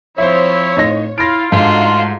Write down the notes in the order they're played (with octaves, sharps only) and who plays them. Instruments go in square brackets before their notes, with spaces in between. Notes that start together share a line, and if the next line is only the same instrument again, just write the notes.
[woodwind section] F3 E4 [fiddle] C4 F4 [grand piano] C5 E5 [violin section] C#5
[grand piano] A2 D#4 A#6
[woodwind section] E4 F4 [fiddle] F5 [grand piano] A#6 D7
[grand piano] G#2 [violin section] A3 D4 D#4 [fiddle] F4 F#4 [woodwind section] F5 C6